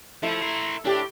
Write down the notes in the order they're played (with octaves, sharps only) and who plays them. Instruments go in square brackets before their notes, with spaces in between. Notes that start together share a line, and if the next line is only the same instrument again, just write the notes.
[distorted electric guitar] F3 [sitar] A3 E4
[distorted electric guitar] A#4 C5
[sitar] A2 G4 [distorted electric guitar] D4